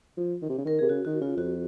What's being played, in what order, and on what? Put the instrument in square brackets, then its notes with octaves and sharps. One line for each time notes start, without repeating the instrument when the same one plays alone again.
[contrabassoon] F3
D#3
C3
C#3
[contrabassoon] D#3 [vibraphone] A#4
[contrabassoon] C3 [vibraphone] G#4
[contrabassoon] C#3 [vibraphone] F#4
[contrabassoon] D#3 [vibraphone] F#4
[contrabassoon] C#3 [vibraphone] F4
[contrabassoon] F2 [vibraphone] F#4